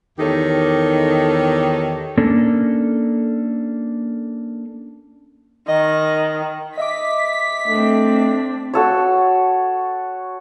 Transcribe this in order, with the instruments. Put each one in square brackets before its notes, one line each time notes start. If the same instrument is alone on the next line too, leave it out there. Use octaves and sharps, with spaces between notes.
[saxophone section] E2 D#3 D#4 G4 A4 C#5
[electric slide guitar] A#3 C#4 D4 A4
[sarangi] D#3 [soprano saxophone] D#5
[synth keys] D#5 E5 D6 [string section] B6
[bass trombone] A3 [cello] C4 D4
[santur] F#4 A4 C#5